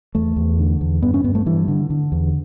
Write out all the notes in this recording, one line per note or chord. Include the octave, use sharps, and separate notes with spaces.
E2 A3
E2
D3
E2
G2 B3
C#4
G2 B3
A3
G2 E3
D3
D3
E2